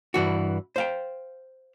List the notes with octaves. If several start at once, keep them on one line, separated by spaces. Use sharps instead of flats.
G2 E3 F#4
C5 F5 G5